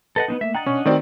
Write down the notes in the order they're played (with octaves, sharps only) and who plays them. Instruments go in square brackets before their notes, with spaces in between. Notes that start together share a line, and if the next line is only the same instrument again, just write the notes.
[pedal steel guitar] A4 D#5 F#5 [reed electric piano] B4
[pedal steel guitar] B3 C4 D#4
[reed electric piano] A3 A#3 [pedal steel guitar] E5
[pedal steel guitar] D4 D#5 F#5 [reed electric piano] G5 A#5 A6
[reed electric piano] B2 C#6 [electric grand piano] C#4
[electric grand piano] D#3 C4 D5 [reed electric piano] A3 F#4